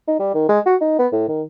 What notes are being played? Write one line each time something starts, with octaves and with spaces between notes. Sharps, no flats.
D#4
G3
D#3
G#3
F#4
D#4
B3
A2
D#3